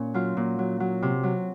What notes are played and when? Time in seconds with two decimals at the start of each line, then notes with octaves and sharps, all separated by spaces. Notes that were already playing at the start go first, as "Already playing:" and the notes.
Already playing: A#2 C#4
0.14 F#3 F4
0.37 A#2
0.59 F#3
0.80 F#3
1.02 C3
1.23 F#3